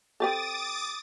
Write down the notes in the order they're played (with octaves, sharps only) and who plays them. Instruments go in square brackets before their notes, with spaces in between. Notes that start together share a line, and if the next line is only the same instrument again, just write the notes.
[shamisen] C4 G4 A4 [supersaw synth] D6 D#6 A6